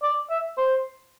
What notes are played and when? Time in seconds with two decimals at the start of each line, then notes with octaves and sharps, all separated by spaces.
0.03 D5
0.30 E5
0.57 C5